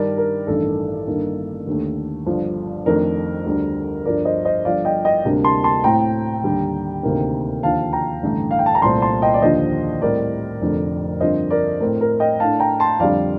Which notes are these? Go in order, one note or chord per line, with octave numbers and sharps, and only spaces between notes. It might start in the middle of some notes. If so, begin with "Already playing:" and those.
Already playing: G2 D#3 G3 D4 A#4 D5
A#4
A1 G2 D#3 A4
G1 G2 D#3 A#3
D#2 D3 A3
G1 G2 F3
F2 D#3 A3 D4 A#4
D2 D3 G3
G1 G2 F3 A#4 D5
C5 D#5
C5 D#5
G1 G2 F3 D5 F5
D#5 G5
D#5 G5
D2 C3 G3 A#3 D4
A5 C6
A5 C6
A2 A3 C4 G5 A#5
D#2 D3 G3
D2 C3 D#3 A#3
D#2 D3 F3 F5 A5
G5 A#5
A1 G2 D3 A3 D4
F5
G5
A5
A#5
C2 A#2 A3 C4 A5 C6
A5 C6
D#5 G5
D5
D#2 D3 F3 C5 D#5
A2 G3 C4 A#4 D5
F1 F2 D3 A3
G2 D3 F3 C4 C5 D#5
A#4 D5
A2 A3 C4 A#4
A#4
D#5 G5
A2 A3 D4 F5 A5
G5 A#5
A5 C6
F2 D3 G3 D5 F5